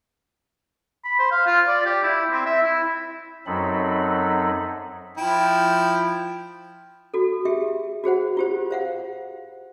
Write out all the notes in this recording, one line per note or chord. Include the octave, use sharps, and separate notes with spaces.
B5
C5
F5
F4
D5
G4
E4
C4
E5
E4
F#2 F#3 C4 D#4 A4 B5
F3 E4 G5
F#4 A4
G4 G#4 E5
F#4 G#4 C5 F#5
F4 G4 C5
C5 F5 F#5